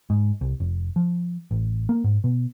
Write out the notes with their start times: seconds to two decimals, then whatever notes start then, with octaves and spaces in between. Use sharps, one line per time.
0.10 G#2
0.41 C2
0.60 F1
0.96 F3
1.51 A1
1.89 A#3
2.04 G#2
2.24 B2